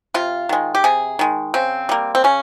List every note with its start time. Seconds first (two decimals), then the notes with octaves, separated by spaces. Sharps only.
0.14 C3 F4
0.49 D#3 G#3
0.75 G4
0.84 C3 G#4
1.19 D#3 G#3
1.54 C#3 C4
1.89 G3 A#3
2.15 C4
2.24 C#3 C#4